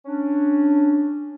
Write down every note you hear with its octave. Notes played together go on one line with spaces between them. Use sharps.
C#4 D4